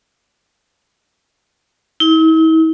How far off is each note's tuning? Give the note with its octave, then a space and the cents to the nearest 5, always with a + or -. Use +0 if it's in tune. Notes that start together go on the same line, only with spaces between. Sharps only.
E4 -45